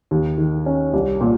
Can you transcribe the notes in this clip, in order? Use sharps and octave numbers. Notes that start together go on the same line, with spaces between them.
D#2
D#3
C#4
C2
A#2